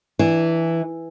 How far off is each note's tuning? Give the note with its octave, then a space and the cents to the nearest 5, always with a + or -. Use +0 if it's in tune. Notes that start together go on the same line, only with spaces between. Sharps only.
E3 +0 D4 +20